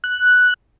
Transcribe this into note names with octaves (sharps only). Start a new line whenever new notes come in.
F#6